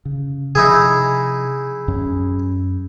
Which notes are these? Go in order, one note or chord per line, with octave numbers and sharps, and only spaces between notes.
C#3
C3 F3 D#4 E4 G#4
F#2 C#4